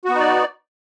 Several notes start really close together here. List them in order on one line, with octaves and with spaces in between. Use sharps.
F#4 B3 D#4 D5